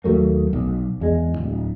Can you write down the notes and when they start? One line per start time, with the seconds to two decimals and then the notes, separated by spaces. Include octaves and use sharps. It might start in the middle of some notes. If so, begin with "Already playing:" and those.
0.04 D#2 F#3 A3 A#3
0.53 B1
1.01 E2 G#3
1.38 D1